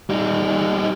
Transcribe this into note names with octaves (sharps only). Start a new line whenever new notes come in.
G3 D#4